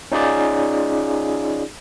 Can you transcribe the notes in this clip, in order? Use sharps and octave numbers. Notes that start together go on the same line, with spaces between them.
C#4 D#4 F4 G#4 D5